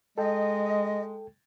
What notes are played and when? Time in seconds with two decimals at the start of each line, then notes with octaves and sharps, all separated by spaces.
0.18 G#3 A4 D#5 G5